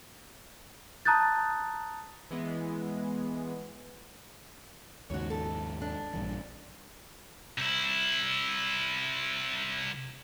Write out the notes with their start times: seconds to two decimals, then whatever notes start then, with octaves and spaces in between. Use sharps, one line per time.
1.05 A5 A#5 D#6 F#6 G6 A6
2.30 E3 G#3 B3
5.10 D#2 G#2 C#3 F#4 C#5
5.30 A4
5.81 D4
6.13 A#1 G2 E3
7.58 C2 E4